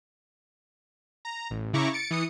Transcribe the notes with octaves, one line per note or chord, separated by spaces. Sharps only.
A#5
A1
C#3 E4 A#5 C#6 D6
A6 C#7 D7
E3 D#6 C#7